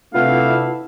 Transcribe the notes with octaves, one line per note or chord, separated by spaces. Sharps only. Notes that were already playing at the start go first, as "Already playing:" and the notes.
C3 A3 D4 E4 F4 B4 F5 F#5